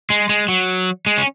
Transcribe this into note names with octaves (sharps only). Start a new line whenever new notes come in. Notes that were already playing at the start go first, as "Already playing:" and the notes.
G#3
G#3
F#3
G#3
C#4